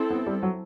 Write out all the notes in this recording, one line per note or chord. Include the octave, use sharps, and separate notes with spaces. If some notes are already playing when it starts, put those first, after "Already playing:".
Already playing: C4 E4 A4
B3
G3
F#3